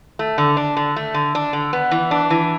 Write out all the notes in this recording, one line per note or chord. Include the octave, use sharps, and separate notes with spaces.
A3
D3
D4
D3
A3
D3
D4
D3
B3
E3
D4
E3